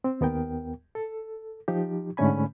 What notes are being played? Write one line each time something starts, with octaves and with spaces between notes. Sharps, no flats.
C4
D#2 B3 A#4 G5
A4
F3 D#4 G4
G#2 D3 A3 C#4 G#5 B5